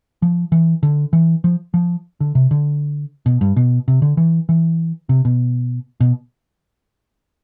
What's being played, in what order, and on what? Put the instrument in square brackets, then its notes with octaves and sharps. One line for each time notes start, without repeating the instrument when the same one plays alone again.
[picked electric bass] F3
E3
D3
E3
F3
F3
D3
C3
D3
B2
G2
B2
C3
D3
E3
E3
C3
B2
B2